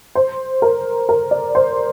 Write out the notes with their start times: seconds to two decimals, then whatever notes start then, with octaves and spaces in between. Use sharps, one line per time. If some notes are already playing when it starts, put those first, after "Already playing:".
0.15 C5
0.62 A#4
1.09 A#4
1.31 D5
1.55 C5